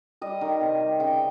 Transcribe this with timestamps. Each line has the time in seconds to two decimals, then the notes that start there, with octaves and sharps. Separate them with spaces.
0.21 G3 D#5
0.41 D#3
0.61 C3
0.80 G3
1.00 C#3 G5